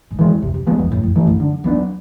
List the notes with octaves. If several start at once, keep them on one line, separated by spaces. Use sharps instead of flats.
G#2
E3 G#3
E2
E2 C3
F2
E2 F3 G#3 B3
E2
F2 A2
F2
F#2 E3 A3
G2
F#2 D3
E2 F#3 B3 D4